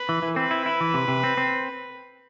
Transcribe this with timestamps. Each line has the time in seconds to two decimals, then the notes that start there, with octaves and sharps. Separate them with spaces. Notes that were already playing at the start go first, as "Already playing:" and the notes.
Already playing: B4
0.09 E3
0.22 E3
0.36 C4 B4
0.51 E4
0.66 E4
0.81 E3
0.94 C3
1.08 C3
1.24 C4
1.37 C4